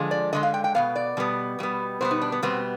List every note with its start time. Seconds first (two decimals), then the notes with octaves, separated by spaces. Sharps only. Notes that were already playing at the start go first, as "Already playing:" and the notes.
Already playing: D3 F3 G#3
0.11 D5
0.33 D3 F3 G#3 D#5
0.43 F5
0.54 G5
0.64 G5
0.75 B2 G3 B3 F5
0.96 D5
1.17 B2 G3 B3
1.59 B2 G3 B3
2.01 B2 G3 B3 C5
2.11 D#4
2.22 D4
2.32 B3
2.43 B2 G3 B3 C4